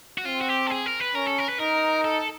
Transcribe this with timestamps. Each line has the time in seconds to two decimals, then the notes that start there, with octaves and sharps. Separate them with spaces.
0.18 F#4
0.25 C4 F4
0.41 F#4
0.49 G4
0.67 A4
0.71 G#4
0.86 A#4
1.00 B4
1.15 C#4 A#4
1.27 A4
1.38 A#4
1.49 B4
1.60 D#4 A#4
2.05 A4